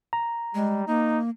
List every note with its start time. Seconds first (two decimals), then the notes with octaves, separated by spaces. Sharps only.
0.13 A#5
0.55 G3 G#3
0.87 A#3 D#4